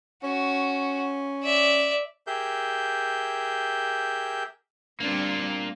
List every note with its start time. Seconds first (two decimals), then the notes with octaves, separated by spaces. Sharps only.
0.24 C#4 F#4
1.43 D5 E5
2.27 G4 G#4 A#4 E5 G6
5.00 G3 A#3 C4 D4 F4